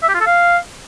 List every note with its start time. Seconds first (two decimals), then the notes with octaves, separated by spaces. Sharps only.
0.03 E5
0.09 G4
0.15 F4
0.21 A4
0.27 F5